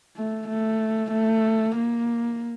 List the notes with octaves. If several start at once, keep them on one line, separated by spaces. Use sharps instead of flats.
A3
A3
A3
A#3